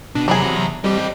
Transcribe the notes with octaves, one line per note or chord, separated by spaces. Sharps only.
B2 D4
E2 C3 F#3 D4 G#4 A#5 B5
G3 C4 G4 D#5